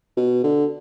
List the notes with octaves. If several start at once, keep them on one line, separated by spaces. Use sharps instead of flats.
B2
D3